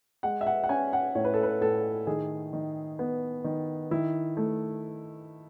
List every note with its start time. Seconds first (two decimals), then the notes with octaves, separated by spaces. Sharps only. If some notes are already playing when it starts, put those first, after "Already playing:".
0.23 G#3 F#5
0.41 E5
0.47 F#5
0.64 F#5
0.69 C#4 G#5
0.93 F#5
1.15 A2 C#5
1.25 B4
1.34 A4
1.43 B4
1.61 A2 A4
2.07 D#3 G#4
2.53 D#3
2.99 B3
3.44 D#3
3.91 D#3 E4
4.37 A3